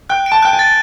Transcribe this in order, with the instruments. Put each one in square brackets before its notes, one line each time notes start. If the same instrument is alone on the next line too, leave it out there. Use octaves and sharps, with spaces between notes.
[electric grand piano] G5 [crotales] F#6
[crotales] D7
[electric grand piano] A5
[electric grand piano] G5 [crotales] F#6
[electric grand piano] G#5
[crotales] A6